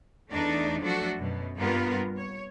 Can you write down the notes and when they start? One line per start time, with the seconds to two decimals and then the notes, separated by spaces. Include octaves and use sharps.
0.30 E2 A3 D4 D#4 D5
0.80 F3 F#3 A3 D4 F#4 A4
1.18 F#2 B2
1.56 G2 A#3 B3 F4 A#4
2.17 C#5